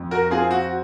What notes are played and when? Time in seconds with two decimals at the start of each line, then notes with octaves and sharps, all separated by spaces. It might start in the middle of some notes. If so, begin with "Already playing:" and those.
Already playing: F2
0.11 F#4 A#4
0.30 C4 F4 G#4
0.51 F#4